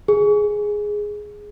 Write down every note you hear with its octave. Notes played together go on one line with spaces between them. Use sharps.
G#4